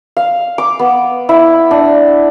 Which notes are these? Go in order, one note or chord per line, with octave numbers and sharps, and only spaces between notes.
F5
D6
B3
E4
D4